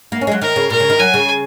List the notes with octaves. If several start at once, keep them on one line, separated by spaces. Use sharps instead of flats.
A#3
C#4
G#3
F#3
D#3 A#4
C#3
A#2 A#4
C#3
D#3
F#3 G#5
C#3